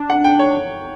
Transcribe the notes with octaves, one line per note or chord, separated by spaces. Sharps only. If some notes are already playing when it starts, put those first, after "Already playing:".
Already playing: D4
F#5
G5
C#5